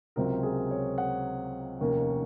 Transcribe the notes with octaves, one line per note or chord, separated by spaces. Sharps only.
C#2 C3 F#3 C4 A#4
G#4
C#5
F#5
F1 D#2 D#3 A#3 C#4